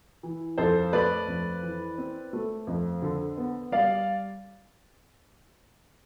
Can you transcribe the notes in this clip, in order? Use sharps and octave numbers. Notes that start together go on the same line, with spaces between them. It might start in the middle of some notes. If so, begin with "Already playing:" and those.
E3
F2 A4 C5
A3 B4 D5
F2
E3
C4
A3
F2
D3
B3
G3 D5 F5